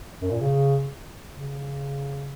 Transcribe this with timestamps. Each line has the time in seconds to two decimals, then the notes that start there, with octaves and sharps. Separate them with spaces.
0.22 F#2
0.31 A#2
0.40 C#3
1.34 C#3